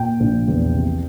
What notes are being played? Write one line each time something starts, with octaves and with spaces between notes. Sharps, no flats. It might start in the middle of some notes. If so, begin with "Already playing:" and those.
Already playing: A#2 G5
A#1
E2
C3